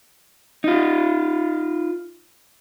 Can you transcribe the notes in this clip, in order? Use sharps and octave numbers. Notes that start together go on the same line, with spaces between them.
D#4 F4